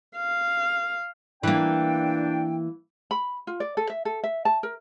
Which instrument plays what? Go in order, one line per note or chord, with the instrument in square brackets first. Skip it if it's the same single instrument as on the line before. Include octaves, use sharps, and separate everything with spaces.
[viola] F5
[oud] E3 A#3 [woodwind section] D4 G5
[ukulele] B5
F4
D5
A4
E5
A4
E5
A5
A#4